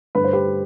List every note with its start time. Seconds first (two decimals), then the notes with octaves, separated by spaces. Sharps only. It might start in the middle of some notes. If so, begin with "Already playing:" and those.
0.15 G2 D3 A3 B4
0.24 C5
0.33 G4 B4